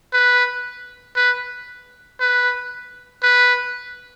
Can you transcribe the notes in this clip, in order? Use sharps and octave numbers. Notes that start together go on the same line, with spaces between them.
B4
B4
B4
B4